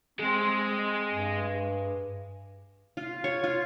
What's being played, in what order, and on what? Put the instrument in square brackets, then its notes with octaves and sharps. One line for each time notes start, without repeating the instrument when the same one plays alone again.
[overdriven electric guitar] G#3 [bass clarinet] C4
[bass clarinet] G2
[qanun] F4
C#5
F4